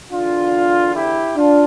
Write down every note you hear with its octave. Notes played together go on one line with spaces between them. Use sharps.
E2 D3 D4 F4
E4 G4
D4 F4